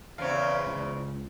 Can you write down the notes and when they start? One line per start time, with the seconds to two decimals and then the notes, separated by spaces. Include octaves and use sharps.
0.18 E2 C#3 C4 C#5 F5
0.67 C#2